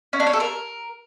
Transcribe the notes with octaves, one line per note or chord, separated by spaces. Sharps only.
C#4
D4
C#5
A4
A#4